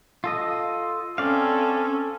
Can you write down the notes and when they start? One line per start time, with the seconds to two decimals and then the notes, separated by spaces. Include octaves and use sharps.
0.24 F4 A4 D#5
1.18 C4 C#4 A4 D5 F5